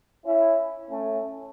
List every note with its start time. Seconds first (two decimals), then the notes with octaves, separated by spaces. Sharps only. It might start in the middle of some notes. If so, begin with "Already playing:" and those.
0.25 C#4 E4
0.90 A3 C#4